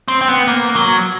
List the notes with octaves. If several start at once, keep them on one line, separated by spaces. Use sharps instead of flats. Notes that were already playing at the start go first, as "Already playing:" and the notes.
C4
C4
B3
A#3
F#3